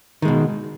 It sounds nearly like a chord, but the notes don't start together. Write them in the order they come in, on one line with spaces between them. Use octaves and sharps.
D#3 G#3 B2